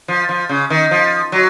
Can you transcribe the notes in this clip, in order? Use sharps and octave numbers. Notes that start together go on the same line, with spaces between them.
F3
F3
C#3
D#3
F3
F#3